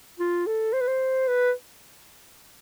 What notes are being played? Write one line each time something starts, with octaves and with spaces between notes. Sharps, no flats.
F4
A4
C5
B4
C5
B4